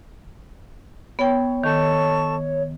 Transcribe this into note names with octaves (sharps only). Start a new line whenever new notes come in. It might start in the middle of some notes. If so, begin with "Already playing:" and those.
B3 C#5 G5
D#3 A4 A5 C#6